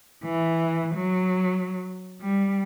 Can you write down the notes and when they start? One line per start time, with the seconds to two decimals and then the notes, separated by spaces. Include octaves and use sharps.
0.24 E3
0.95 F#3
2.21 G3